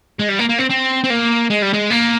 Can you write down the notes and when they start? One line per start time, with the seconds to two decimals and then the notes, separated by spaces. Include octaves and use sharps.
0.19 G#3
0.29 G3
0.39 A#3
0.49 A#3
0.59 C4
0.70 C4
1.04 C4
1.10 A#3
1.50 G#3
1.62 G3
1.74 G#3
1.91 A#3